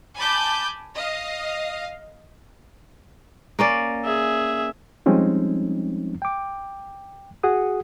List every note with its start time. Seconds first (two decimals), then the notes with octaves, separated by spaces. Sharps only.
0.17 G#5 A5 B5 D6 G6
0.95 D#5 F5
3.59 A#3 C#4 D5
4.04 G#4 E5
5.06 F3 G3 G#3 C4 C#4 D#4
6.22 G5 D6
7.43 F#4 G#4 F#5 D#6